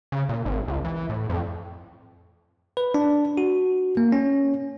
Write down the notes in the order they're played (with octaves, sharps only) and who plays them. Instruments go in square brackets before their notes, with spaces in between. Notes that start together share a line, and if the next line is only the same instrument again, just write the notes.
[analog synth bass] C#3
A#2
G#1
C#2
E3
A2
F2
[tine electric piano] B4
D4
F#4
A#3
C#4